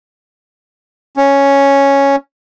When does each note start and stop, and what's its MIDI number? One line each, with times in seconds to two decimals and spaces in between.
1.17 2.16 61